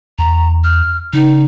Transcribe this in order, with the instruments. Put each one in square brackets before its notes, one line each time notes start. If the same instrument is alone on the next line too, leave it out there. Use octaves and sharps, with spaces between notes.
[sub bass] E2 [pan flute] A#5
[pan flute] F6
[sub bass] C#3 [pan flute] D#4